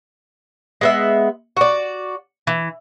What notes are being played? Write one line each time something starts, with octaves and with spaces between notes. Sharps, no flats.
G#3 B3 E5
F#4 D5
E3